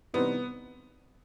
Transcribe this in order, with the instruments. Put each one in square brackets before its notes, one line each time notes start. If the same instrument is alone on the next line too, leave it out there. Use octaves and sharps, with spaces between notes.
[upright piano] C3 E3 G3 C4 D#4 [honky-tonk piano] B3